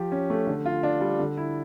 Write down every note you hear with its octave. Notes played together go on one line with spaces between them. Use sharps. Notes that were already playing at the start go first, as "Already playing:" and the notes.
Already playing: F3 G4
C#4
A3
D3
F4
D4
G3
D3
E4